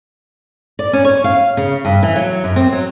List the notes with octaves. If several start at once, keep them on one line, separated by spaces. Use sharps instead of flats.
D5
C#4
C#5
F5
C#3
G2
E3
F#3
F#2
C4
F#3